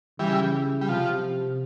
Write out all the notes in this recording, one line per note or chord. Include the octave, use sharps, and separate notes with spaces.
C#3 E3 G3
G3
C3 F3